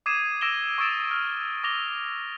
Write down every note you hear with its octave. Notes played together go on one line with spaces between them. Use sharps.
D6 D#6 G#6 C7 D#7 E7
D6 E6 A#6 D7 E7 G7
C#6 D#6 E6 A6 D7 E7
F6
D6 A#6 F7 G7